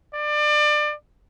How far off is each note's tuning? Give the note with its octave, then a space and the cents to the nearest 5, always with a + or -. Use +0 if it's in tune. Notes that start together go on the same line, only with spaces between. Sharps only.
D5 +30